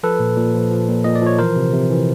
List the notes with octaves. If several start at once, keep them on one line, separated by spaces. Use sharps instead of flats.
F3 A4 B4
A#2
A#2
F3
F3
A#2
A#2 D#5
D5
F3 C#5
E3 A#4 C5
C3
C3
E3